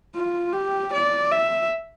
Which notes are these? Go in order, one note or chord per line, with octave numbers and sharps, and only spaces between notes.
F4
G4
D5
E5